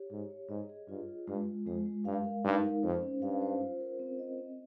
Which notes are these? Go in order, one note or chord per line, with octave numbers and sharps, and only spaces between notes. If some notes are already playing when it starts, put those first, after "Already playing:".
Already playing: G4 C#5
G#2 G4
C#5
G#2 D#5
G#4
G2 F4
F4
G2 G#3
G#3
F2 G#3
G#3
G2 F5
A#4
G2 D#4
A#4
F2 C5
C#4
G2 F5
C5
F4
A#4
C4
D#5
C4